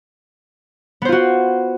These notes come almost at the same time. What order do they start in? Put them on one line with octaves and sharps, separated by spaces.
B3 C5 F4 F#4